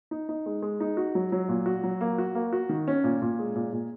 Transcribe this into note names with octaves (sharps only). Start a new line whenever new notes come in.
D#4
D#4
G#3
G#3
D#4
F#4
F#3
F#3
A#2
F#4
F#3
A#3
F#4
A#3
F#4
D#3
C#4
A#2
A#2
G#3
A#2
A#2